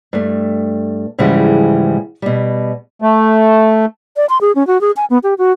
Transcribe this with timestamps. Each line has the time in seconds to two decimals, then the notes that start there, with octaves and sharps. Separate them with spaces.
0.13 G2 A3
1.19 G#2 C#3 E3 F3 G3 G#3
2.22 B2 G3
3.02 A3
4.16 D5
4.29 C6
4.41 G#4
4.55 C#4
4.67 F#4
4.81 G#4
4.97 G#5
5.10 B3
5.23 G4
5.38 F#4